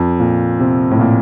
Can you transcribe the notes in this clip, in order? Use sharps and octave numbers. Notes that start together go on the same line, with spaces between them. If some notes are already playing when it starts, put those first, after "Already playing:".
Already playing: F2
A#2
C3
A2
A#2